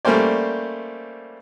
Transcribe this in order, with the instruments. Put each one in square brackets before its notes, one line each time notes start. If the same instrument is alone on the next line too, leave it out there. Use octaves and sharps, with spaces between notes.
[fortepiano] G3 A3 A#3 C#4 C5 D5